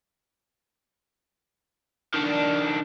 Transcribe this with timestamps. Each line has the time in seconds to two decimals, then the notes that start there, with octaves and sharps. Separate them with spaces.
2.14 D#3 D4